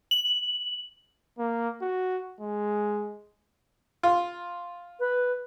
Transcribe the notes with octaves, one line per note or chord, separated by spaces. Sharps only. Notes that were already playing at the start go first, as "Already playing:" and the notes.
F#7
A#3
F#4
G#3
F4
B4